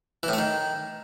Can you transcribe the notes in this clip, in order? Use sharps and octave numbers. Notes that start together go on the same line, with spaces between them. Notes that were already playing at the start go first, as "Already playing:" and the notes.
E3
A2
A3
D#3